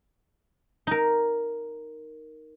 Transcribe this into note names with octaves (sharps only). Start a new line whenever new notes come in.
D#4 A#4